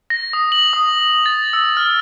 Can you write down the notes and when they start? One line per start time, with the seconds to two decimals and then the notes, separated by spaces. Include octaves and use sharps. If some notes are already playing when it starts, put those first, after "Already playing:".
0.10 A#6
0.33 D#6
0.52 F#7
0.73 D#6
1.26 A6
1.53 E6
1.77 F6